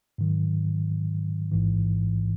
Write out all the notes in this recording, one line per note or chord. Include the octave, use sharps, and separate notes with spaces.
G#2 D#3 F#3
A1 G#2 E3